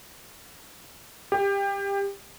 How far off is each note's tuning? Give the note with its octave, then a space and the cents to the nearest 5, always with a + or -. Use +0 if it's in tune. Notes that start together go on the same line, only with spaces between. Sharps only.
G4 +25